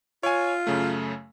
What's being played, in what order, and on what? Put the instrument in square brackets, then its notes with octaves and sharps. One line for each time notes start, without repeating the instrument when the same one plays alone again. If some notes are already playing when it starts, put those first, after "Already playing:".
[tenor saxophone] F4 [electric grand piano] C#5 G#5
[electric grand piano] F#2 C#3 A3